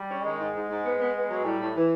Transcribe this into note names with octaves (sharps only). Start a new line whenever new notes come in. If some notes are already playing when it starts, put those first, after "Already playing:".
Already playing: G3
C#4
D#3 G#3
G#2
G#2
G#2
B3
B3
B3
F#3
A2 G3
A2
E3